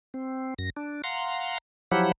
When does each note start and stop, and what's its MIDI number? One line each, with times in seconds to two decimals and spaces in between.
0.14 0.54 60
0.59 0.70 42
0.59 0.70 94
0.77 1.02 62
1.04 1.58 77
1.04 1.58 78
1.04 1.58 82
1.04 1.58 84
1.91 2.12 53
1.91 2.12 54
1.91 2.12 64
1.91 2.12 67
1.91 2.12 78